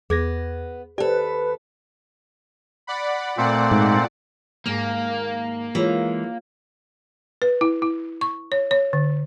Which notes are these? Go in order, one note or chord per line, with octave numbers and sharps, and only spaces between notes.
E2 B3 G#4 G#6 A#6
D#2 G4 A4 B4 C5 D5
D5 F#5 B5
A#2 A3 C4 D5 F#5
G#2
D#2 G#2 A#3
E3 G#3 F4 C#5
B4
E4
E4
C#6
C#5
C#5
D3